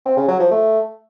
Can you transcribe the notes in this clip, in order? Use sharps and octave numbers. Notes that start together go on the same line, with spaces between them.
C4
C#3
F#3
F3
A3